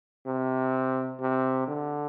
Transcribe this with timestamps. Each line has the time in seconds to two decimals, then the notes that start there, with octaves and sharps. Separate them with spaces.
0.26 C3
1.20 C3
1.68 D3